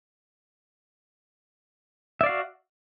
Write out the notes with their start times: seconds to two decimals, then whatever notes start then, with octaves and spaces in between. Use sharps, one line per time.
2.21 E5
2.23 D5
2.26 F5
2.29 F#4